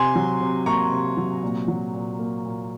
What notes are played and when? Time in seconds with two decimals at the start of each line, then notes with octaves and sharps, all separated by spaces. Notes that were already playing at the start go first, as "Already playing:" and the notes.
Already playing: C3 G#5 C6
0.15 F#3
0.41 C3
0.66 A#3 A#5 C#6
0.91 C3
1.17 F#3
1.42 A#2
1.68 F#3
1.93 A#2
2.19 A#3
2.45 A#2